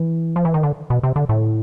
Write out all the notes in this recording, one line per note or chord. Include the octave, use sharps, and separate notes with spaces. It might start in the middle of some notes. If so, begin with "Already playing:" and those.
Already playing: E3
F3
E3
D#3
D3
B2
C3
D3
A2